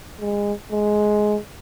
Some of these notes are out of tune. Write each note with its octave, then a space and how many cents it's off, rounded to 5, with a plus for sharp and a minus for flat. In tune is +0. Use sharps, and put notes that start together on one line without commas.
G#3 -25
G#3 +10